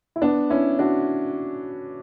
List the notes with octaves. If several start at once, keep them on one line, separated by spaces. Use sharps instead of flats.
E4
B3 D4
C#4 E4
D4 F#4